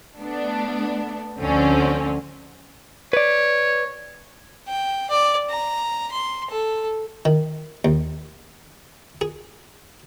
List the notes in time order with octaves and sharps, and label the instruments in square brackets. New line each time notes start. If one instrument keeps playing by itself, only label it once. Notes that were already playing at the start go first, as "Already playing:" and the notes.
[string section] A3 B3 D4
D2 D3 F3 C4 C#4
[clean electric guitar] B4 D5 [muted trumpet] C#5
[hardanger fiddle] G5
D5
A#5
C6
A4
[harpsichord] D#3
D#2
G#4